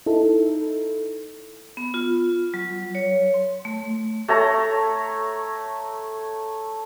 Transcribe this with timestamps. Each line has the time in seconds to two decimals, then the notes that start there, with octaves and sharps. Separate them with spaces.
0.06 D#4 E4 A4
1.77 B3
1.94 F4
2.54 F#3
2.95 C#5
3.34 C6
3.65 A3
4.28 A3 C#5 A#5